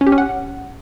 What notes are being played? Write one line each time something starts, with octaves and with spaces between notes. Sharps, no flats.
C#4
G4
C#4
F#5